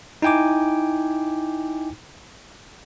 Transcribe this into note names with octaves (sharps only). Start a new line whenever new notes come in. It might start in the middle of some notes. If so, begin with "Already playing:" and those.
D#4 E4 G5 G#5 D6